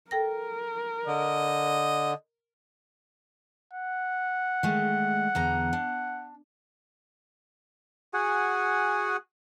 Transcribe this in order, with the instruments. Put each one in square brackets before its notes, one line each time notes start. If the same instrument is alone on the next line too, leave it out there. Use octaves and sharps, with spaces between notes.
[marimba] A4 G5 A#6 [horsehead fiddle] A#4
[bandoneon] D3 [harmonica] D#5
[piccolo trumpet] F#5
[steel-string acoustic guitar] D#3 G#3 A3
E2 D3 A#5
D4
[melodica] F#4 G#4 F#5 G#5